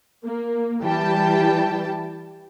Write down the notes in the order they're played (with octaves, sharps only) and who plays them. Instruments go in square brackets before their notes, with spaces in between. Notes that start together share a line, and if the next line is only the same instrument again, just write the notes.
[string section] A#3
E3 G3 G5 A5